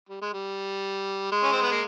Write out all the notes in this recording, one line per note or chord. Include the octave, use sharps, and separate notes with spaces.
G3
G#3
G3
G#3
C#4
C4
B3
A#3